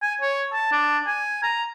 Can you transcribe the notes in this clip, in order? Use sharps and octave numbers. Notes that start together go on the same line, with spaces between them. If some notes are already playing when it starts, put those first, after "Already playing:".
G#5
C#5
A5
D4
G#5
A#5